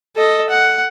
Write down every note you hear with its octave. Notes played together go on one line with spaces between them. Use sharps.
A4 D#5
F#5